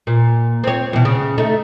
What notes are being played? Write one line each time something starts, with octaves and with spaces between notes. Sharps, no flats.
A#2
C4 C#5
E2 B2
C#3
A3 D#4